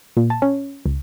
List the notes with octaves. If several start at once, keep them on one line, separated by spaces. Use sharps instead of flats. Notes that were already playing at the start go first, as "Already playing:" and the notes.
A#2
A5
C#4
C#2